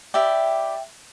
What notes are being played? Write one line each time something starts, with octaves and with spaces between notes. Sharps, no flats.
E4 G4 D5 E5 G5